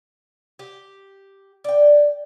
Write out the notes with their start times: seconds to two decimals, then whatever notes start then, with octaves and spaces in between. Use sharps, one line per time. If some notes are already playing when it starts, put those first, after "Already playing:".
0.59 G4
1.64 D5 G5